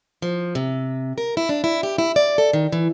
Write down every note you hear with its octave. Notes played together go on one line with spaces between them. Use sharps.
F3
C3
A#4
E4
D4
E4
G4
E4
D5
A4
D#3
E3